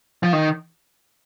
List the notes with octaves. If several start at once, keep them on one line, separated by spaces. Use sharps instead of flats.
F3
D#3